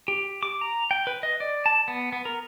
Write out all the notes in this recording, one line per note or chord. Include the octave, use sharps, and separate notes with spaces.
G4
D6
A#5
G5
B4
D#5
D5
A5
B3
B3
A#4